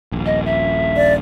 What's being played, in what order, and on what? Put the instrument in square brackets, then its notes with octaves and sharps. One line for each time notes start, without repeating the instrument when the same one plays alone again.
[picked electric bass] D#1 A#1
[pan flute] D#5
E5
[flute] D5